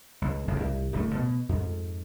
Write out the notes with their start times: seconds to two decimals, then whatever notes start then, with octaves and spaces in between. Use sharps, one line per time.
0.22 C#2
0.48 F#1 F2 A2 C3
0.60 C2
0.93 D1 F#2 A3
1.15 B2
1.49 F2 G#2